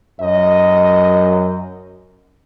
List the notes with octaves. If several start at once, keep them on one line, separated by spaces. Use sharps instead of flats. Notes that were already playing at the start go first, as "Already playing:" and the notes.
F#2 D#5